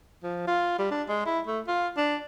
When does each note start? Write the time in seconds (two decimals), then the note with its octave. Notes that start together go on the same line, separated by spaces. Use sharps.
0.23 F3
0.47 F4
0.78 G3
0.91 D4
1.09 G#3
1.26 E4
1.47 A3
1.67 F4
1.97 D4